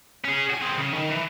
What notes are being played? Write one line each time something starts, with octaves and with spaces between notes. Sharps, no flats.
C#4 G#4
F#4 G#5
C4 G#4
C#3
D#3
E3